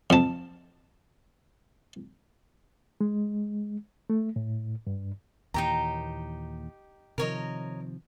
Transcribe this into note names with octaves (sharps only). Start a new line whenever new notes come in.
F2 A5
G#3
A3
A2
G2
D#2 A#2 E3 D#4 G4 A#5
C3 D#3 F3 A#4 C#5 D#5